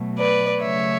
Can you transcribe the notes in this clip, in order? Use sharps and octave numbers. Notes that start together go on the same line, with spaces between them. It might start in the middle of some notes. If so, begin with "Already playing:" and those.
Already playing: B2 F#3 A3
B4 D5
C#3 F#3 A3 C#5 E5